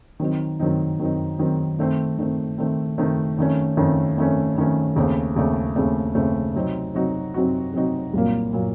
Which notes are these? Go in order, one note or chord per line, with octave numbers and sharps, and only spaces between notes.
D#3 F#3 C4 D#4
D#3 F#3 C4 D#4
D#3 F#3 C4 D#4
D#3 F#3 C4 D#4
D#3 A3 C4
D#3 A3 C4
D#3 A3 C4
D#3 A3 C4
F2 D#3 A3 C#4
F2 D#3 A3 C#4
F2 D#3 A3 C#4
F2 D#3 A3 C#4
D#2 C#3 A3 C4
D#2 C#3 A3 C4
D#2 C#3 A3 C4
D#2 C#3 A3 C4
C3 F#3 C4 D#4 F#4
C3 F#3 C4 D#4 F#4
C3 F#3 C4 D#4 F#4
C3 F#3 C4 D#4 F#4
C2 A#2 F#3 A#3
A#2 F#3 A#3